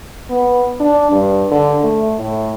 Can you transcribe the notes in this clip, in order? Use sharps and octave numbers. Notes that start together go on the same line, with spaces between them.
B3
D4
G2
D3
A3
A2